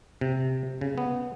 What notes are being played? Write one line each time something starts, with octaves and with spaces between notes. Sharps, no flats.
C3
C#3
B3